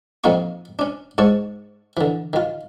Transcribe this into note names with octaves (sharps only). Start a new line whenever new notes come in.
F2 A#2 C4 D#4 F4 C#6
C#4 D4
G#2 C#5 A5 C#6
D3 E3
D#3 F4